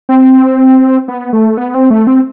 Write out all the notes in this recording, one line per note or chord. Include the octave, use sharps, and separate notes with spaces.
C4
B3
A3
B3
C4
A3
C4